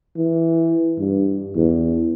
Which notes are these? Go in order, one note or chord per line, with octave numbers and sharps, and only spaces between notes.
E3
G2
E2